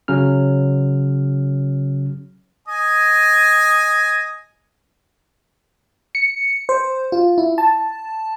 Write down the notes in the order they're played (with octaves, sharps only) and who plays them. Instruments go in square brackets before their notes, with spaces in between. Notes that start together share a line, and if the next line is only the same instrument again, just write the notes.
[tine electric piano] C#3 F#3 C#4 F6
[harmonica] D#5 G#5
[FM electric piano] C#7
C5
F4
E4
A5